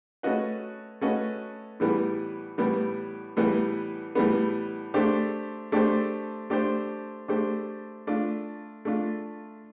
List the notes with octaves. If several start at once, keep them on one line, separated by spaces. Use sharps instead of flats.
A3 C#4 F#4 B4 D#5
A3 C#4 F#4 B4 D#5
A2 E3 G3 B3
A2 E3 G3 B3
A2 E3 G3 B3
A2 E3 G3 B3
A3 D4 G4 C5
A3 D4 G4 C5
A3 D4 G4 C5
A3 D4 G4 C5
A3 D4 F4
A3 D4 F4